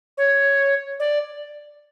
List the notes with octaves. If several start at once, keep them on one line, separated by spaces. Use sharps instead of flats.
C#5
D5